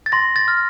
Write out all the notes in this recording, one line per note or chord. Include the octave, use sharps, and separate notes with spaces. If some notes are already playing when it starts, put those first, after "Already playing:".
A6
C6 A#6
A6
F6